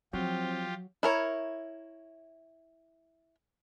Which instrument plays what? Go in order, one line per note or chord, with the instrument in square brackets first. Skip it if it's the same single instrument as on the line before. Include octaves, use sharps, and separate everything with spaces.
[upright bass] F3 [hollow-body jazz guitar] F#3 [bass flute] C4 [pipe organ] F4 G4
[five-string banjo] E4 A#4 C#5